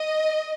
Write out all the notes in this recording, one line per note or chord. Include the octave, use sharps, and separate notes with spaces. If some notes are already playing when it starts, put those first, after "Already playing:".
Already playing: D#5